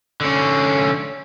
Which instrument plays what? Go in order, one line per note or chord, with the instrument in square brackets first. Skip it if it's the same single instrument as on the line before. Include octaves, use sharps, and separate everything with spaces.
[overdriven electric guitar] D3 C#4